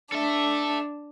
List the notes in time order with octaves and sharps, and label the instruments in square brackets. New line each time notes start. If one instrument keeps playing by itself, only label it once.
[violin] D4 [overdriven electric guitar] A4 E5